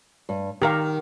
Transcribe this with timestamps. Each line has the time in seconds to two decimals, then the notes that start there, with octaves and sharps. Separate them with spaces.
0.29 G2
0.62 D#3 G4 A#4 F5